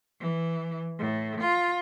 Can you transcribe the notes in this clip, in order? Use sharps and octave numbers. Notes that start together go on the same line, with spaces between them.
E3
A2
F4